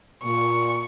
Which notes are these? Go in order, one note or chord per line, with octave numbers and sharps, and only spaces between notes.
A#2 C#6